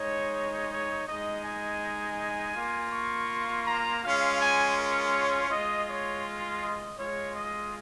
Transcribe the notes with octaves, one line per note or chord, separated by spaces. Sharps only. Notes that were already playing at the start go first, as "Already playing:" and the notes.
Already playing: G#3 D#4 C#5
C#5
G#3 D#4 D#5
G#5
A#3 F4
C#6
A#5
G#3 C#4 F4 F5
G#5
A#4
C#5
G#3 F4 D#5
C#5
D#5
G#3 F4 C#5
D#5